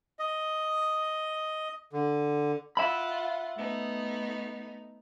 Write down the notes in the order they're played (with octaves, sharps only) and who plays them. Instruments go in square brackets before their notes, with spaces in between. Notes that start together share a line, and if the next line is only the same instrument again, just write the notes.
[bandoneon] D#5
D3
[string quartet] F4 F#5 [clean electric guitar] E5 B5
[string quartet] A3 B3 D#4